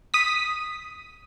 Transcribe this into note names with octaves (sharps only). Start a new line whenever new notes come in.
D#6 B6